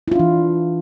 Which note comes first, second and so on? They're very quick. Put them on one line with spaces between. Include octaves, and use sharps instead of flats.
E4 F4 D4 E3